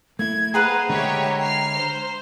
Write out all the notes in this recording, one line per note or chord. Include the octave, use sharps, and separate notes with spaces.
A3 A#3 E4 G#6
G#4 B4 C5 F#5 A#5
D3 G#3 G4 C#5 E5
F6 C7
C5